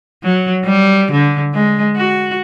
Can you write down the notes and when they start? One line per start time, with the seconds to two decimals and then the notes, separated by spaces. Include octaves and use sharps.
0.23 F#3
0.64 G3
1.12 D3
1.54 G#3
1.96 F#4